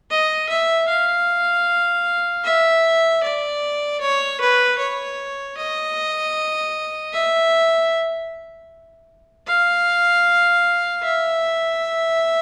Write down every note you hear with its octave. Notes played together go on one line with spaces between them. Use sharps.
D#5
E5
F5
E5
D5
C#5
B4
C#5
D#5
E5
F5
E5